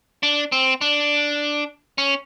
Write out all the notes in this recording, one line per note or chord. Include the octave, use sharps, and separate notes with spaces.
D4
C4
D4
C#4